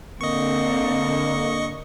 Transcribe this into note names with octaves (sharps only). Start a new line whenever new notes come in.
D3 A#3 C4 D#5 C#6